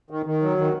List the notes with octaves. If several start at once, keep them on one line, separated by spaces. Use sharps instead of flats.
D#3
D#3
F#3
D#3